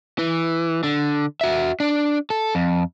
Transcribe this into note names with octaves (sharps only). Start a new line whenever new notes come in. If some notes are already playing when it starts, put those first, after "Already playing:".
E3
D3
F#4 E5
D4
A4
F2